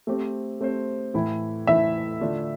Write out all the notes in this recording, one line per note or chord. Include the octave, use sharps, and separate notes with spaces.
A3 C4 G4 C5
A3 C4 G4 C5
A2 E3 A3 E4
A2 E3 A3 E4 E5
D3 A3 D4 F4